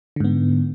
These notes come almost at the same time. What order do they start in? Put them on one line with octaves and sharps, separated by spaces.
D3 G#2 B3